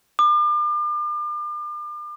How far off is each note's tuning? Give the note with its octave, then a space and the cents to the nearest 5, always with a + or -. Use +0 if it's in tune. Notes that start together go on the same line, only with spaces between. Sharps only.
D6 +40